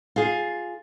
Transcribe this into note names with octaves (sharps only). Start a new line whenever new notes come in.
F4 G#4